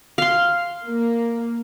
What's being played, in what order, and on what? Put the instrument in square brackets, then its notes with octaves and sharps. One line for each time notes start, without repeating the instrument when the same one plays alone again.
[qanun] F5 C6
[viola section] A#3